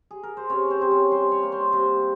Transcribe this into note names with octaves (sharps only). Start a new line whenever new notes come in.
G#4
A#4
C5
C3 C#4 C#5
C4 C5
C3 C5
C#4 C#5
G3 C5 C6
C#5 C#6
A#3
C5 C6
C3 C5 C6